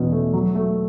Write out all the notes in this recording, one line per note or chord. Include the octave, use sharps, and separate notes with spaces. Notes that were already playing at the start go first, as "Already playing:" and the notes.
Already playing: E2 B2 C#4
A3
F#3
A3